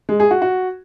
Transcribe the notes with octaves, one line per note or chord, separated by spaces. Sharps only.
G#3
G#4
F#4
F#4